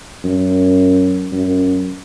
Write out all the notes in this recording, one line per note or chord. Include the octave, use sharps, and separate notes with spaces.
F#2
F#2